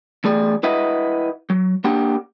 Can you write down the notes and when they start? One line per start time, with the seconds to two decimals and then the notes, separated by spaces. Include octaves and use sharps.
0.24 E2 A3 G#4 D5
0.63 E4 B4 D#5 E5 F#5
1.50 F#3
1.84 A#3 D4 G4 F#5